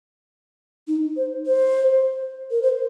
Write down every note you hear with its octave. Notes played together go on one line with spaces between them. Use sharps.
D#4
C5
C5
A#4
C5